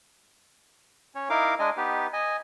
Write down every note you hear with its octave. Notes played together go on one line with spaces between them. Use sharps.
C#4 C#5
D#4 E4 A#4 F5 D6
G#3 D4 D#5 G#5
B3 D#4 G4 B4
D#5 G#5